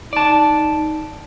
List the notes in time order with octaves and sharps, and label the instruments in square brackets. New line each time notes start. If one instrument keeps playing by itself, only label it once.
[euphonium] D#4 [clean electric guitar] D5 A5